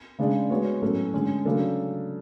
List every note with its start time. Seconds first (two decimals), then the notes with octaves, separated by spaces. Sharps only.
0.19 C#3 G#3 D4 G#4 D5
0.50 G#3 B3 F#4 C#5
0.82 A2 F#3 C#4 F#4 A4
1.14 D3 G#3 C#4 G#4
1.45 C#3 F#3 A3 D4 A4